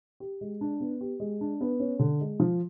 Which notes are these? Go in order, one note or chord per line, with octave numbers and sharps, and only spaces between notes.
G4
G#3
D4
B3
G4
G#3
D4
B3
C#4
D3
G#3
F3